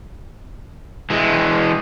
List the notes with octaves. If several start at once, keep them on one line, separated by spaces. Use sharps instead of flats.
E3 G#3